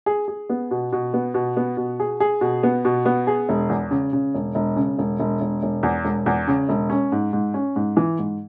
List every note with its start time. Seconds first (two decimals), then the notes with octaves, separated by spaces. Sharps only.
0.06 G#4
0.28 G#4
0.50 B3
0.71 B2
0.93 B2
1.14 B3
1.34 B2
1.57 B3
1.77 B2
2.00 G#4
2.20 G#4
2.41 B2
2.63 B3
2.85 B2
3.06 B3
3.27 G#4
3.49 E1
3.69 E2
3.91 C#3
4.13 C#3
4.35 E1
4.55 E1
4.76 C#3
4.98 E1
5.20 E1
5.41 E1
5.63 E1
5.83 E2
6.05 E1
6.26 E2
6.47 C#3
6.69 E1
6.90 C#4
7.12 G#2
7.33 G#2
7.54 C#4
7.76 G#2
7.97 E3
8.19 G#2